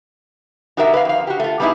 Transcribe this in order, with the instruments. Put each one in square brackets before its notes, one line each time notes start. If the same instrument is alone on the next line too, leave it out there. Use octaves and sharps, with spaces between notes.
[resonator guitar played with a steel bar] D#4 F#4 G4 A#4 D#5 E5
B4 D5 F5
F2 F5
F#4 G4
A3 F4
G3 A3 B3 D#4 E4 G#4